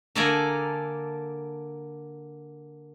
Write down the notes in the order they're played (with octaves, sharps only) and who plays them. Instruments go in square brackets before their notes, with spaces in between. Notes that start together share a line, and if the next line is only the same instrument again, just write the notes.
[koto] D3 A#3 A4 D5 G#5 A#5